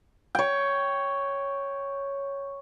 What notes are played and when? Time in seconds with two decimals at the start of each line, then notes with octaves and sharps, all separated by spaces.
0.35 C#5 G5